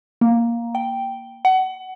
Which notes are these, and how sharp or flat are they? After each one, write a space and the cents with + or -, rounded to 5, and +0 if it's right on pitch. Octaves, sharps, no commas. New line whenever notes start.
A#3 +5
G5 -5
F#5 +25